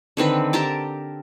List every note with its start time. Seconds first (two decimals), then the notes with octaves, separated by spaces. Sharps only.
0.17 D3 D#3 C4 B4
0.53 G4 A#4 A5 D6